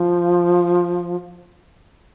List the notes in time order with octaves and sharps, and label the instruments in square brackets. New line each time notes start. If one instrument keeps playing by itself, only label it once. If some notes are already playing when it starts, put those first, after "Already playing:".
Already playing: [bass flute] F3